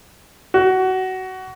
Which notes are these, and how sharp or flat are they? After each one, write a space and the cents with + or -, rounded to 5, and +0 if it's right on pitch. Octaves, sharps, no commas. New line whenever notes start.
F#4 +20